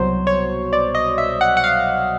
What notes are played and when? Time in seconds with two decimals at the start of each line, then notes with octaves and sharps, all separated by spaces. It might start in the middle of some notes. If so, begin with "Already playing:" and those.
Already playing: C2 B2 F#3 C5
0.27 C#5
0.73 D5
0.95 D#5
1.18 E5
1.41 F#5
1.57 F#5
1.64 F5